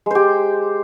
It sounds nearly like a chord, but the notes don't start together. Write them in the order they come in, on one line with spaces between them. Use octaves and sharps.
G#3 C5 G4